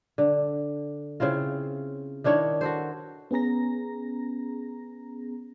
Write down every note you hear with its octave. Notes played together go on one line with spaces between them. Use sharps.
D3
C#3 C4 E4 F4
D#3 D4 E4 C#5
F#4 A4 C5
B3 C#4 G#4 A#5 A#6